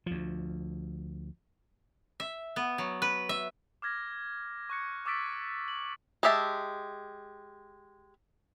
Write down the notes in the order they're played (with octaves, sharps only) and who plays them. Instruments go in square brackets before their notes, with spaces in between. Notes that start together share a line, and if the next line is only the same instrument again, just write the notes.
[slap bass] D2 F3
[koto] E5
B3
F#3
B4
E5
[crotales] D6 F6 G#6 A#6
C#6 F#6 C#7
C#6 D6 E6 A6 B6 D7
F#7
[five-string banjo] G#3 G4 E5 A5